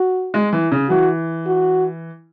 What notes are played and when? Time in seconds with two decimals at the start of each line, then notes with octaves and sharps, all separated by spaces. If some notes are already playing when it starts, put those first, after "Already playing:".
Already playing: F#4
0.34 G#3
0.53 E3
0.72 C#3
0.89 E3 F#4
1.47 F#4